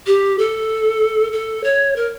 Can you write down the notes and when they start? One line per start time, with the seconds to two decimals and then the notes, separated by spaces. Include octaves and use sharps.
0.07 G4
0.39 A4
1.32 A4
1.64 C#5
1.96 A#4